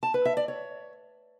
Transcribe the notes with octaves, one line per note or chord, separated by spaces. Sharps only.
A5
B4
E5
D5
C#5